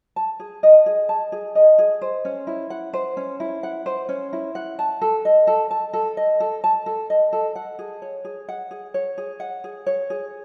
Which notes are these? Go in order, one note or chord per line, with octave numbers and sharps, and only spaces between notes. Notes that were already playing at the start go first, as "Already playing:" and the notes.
A5
G#4
D#5
G#4
A5
G#4
D#5
G#4
C5
C#4
E4
F#5
C5
C#4
E4
F#5
C5
C#4
E4
F#5
A5
A4
D#5
A4
A5
A4
D#5
A4
A5
A4
D#5
A4
F#5
G#4
C#5
G#4
F#5
G#4
C#5
G#4
F#5
G#4
C#5
G#4